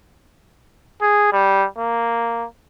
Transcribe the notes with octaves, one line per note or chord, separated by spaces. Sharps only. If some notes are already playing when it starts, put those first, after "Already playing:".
G#4
G3
A#3